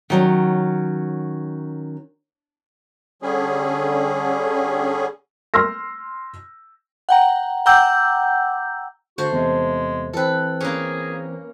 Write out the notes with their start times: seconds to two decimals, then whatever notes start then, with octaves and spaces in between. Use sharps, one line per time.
0.10 D#3 F#3 C#4
3.22 D3 G3 C#4 G#4
5.54 C6 E6 F6 A#6
7.09 F#5 G5 A#5
7.66 F#5 G5 A#5 D6 E6 G6
9.18 D3 A3 F#4 C5
9.32 E2 C3 G#3
10.13 E3 C4 A4 B4
10.61 A#3 C#4 G#4